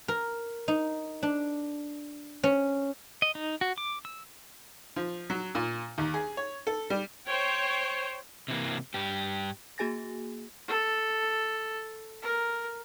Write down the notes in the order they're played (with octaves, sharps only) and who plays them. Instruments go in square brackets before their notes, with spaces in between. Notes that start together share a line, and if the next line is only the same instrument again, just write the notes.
[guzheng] A#4
D#4
D4
C#4
[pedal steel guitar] D#5
D#4
F#4
D6
E6
[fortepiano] F3
F#3
A#2
D#2
G#4
C#5
A4
G3
[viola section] C5 C#5 G5
[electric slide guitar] C3 E3 A#3
G2 G4
[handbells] A#3 F#4 G#4 G#5 A6 A#6
[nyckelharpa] A4
A#4